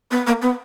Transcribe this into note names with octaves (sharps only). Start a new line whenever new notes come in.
B3
A#3
B3